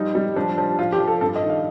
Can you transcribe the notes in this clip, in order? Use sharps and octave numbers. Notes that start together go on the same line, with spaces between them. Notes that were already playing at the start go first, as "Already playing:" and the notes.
Already playing: F3 G3 D#4
G3
F3 D4
F3
F3 F4
G4
F3
A4
G2 A4
D#5
D#3
F5